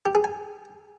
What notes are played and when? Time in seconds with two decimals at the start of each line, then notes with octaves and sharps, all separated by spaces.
0.06 G4
0.15 G#4
0.24 G#5